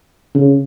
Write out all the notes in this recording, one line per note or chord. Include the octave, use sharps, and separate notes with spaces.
C#3